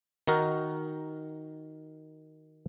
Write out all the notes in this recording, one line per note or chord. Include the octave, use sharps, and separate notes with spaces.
D#3 D#4 F#4 A#4